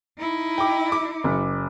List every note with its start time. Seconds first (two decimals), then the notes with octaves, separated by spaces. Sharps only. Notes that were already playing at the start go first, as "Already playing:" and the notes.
0.18 D#4 E4
0.58 G5 D6
0.92 D6
1.24 F#1